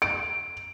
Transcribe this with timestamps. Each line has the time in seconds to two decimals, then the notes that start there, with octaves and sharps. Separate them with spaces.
0.02 D7